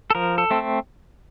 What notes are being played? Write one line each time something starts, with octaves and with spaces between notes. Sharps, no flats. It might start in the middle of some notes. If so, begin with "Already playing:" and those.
A4
F3 A#4
A4
A3 C4